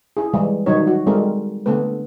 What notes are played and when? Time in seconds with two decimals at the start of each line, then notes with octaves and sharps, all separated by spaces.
0.17 E4 G#4
0.34 E3 G3 G#3
0.66 D#3 E3 F#3 G3 D#4 C#5
0.87 F#4
1.07 G3 G#3 C4 A4 A#4
1.66 D3 A3 B3 C4 B4